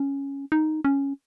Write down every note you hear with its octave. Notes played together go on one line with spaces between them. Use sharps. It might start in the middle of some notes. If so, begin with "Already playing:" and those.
Already playing: C#4
D#4
C#4